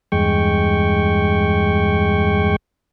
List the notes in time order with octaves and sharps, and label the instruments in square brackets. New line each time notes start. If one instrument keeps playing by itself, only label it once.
[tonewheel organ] E2 G2 G#3 G5 C#6